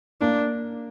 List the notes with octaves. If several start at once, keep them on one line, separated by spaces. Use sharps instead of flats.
A#3 D4